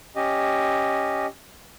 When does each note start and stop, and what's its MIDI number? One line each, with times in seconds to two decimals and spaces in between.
0.16 1.26 61
0.16 1.26 67
0.16 1.26 75